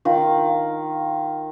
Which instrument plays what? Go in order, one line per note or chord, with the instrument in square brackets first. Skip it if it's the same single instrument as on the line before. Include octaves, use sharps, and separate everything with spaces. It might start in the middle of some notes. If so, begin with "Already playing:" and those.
[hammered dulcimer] D#3 F4